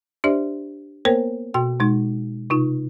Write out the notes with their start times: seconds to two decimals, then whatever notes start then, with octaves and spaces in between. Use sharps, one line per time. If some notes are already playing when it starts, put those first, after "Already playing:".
0.24 D4 G4 C5 D5 E5
1.05 A#3 B3 A#4 C5 C#5 G5
1.54 B2 F#4 G5
1.80 B2 G#3 D#4
2.50 C3 D#4 F4